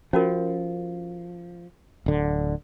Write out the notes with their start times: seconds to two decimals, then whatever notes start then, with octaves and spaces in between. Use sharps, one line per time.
0.13 F3 C#4 F#4 A#4
2.06 D1 D3